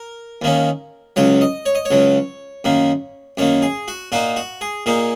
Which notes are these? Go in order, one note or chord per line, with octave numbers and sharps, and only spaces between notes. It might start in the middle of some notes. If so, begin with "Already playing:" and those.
Already playing: A#4
D#2 D#3 A#3 C#4
C#2 C#3 F#3 C#5
D#5
C#5
D#5
C#5
C#2 C#3 F#3
F#2 D#3 A#3
F#2 D#3 A#3 C#5
G#4
F#4
A#2 A#3 D#4 F#4
F#4
G#4
A#2 A#3 D#4 G#4